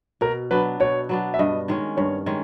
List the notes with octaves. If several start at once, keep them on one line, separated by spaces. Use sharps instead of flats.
B2 A#4
F#3 B3 D4 B4
B2 C#5
F#3 B3 D4
E5
G2 D#5
D#3 G#3 C#4
G2 C#5
D#3 G#3 C#4